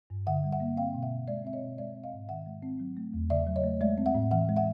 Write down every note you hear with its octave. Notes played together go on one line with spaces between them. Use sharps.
G2
D3 E5 F#5
G3
E5 F#5
A#3
C4 F5 G5
B2
E5 F#5
B2
G#3 D5 E5
C4 E5
C#5 D#5
B2
G#3 D5 E5
C4
D#5 F5
G#2
D#3 E5 F#5
G#3
C4
F#3
A3
E2
C#3 D5 E5
F#3
C#5 D#5
A3
G#3 D5 E5
C4
E5 F#5
A2
E3 E5 F#5
G#3
E5 F#5